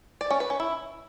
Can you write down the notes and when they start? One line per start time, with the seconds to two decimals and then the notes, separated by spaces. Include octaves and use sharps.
0.21 D5
0.30 C#4
0.40 B4
0.50 C#4
0.60 E4